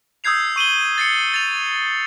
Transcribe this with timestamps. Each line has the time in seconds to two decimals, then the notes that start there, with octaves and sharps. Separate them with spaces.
0.24 D#6 E6 G6 G#6 C7 F7
0.56 C#6 D#7 F#7 G7
0.98 A6 C7 C#7
1.34 A6 F7